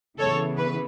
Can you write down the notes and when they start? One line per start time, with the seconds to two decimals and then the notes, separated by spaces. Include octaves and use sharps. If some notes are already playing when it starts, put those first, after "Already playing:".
0.19 C#3 E3 B3 A4 C#5
0.58 B4